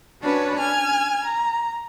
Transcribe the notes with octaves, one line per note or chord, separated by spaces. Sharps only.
C#4 D4 F#4 B4 C#5
G#5 F6 G#6
A#5